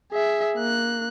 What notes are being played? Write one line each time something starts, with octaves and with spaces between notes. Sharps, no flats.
G#4 E5
A#3 F#6